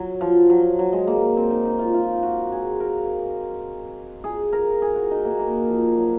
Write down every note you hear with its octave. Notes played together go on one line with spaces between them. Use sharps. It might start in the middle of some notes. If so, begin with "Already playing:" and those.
Already playing: F#3
F3
F#3
F#3
G#3
A#3
C4
D#4
D#4
F4
F4
F#4
G#4
A#4
G#4
A#4
G#4
F#4
D#4
A#3
A#3
F3
F#3